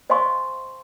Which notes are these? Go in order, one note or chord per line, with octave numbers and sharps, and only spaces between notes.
C5 D#5 F5 G#5 C6 C#6